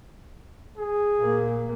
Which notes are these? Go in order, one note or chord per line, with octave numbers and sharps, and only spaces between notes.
G#4
A#2 A#3